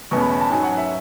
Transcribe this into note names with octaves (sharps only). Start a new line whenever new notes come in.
E2 B2 A3 C#4 C#6
B5
B5
A5
G#2 F#3 C#4 G#5
F#5
E5